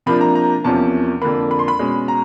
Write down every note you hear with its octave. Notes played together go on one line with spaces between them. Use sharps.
C3 F3 A#3 D4 B5
A#5
A#5
E2 C3 F3 A#3 C#4 A5
F2 D3 F3 A#3 B5
B5
C6
B5
B2 G#3 C#4
A#5